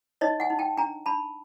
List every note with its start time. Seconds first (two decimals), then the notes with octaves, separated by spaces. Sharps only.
0.21 D#4 C#5 D#5
0.40 F#5 G#5
0.50 D#4
0.59 G5 A5
0.77 D4 G#5 A#5
1.06 D4 A5 B5